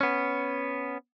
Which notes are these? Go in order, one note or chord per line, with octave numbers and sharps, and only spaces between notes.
B3 C#4